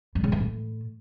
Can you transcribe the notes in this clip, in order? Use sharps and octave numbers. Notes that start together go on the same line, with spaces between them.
G2
C#3
E3
A2